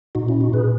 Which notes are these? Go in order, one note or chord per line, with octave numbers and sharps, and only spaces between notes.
A#2 D#4 F#4
C#4 E4
D#4 F#4
A#2 G#4 B4